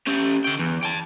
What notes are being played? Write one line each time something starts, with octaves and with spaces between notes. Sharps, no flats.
C#4 G4
D3 G5
E2
G5 A5